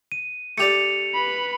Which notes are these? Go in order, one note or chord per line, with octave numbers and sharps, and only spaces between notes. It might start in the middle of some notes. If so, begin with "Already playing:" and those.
D#7
A3 G4 D5 C#7 F7
B4 B5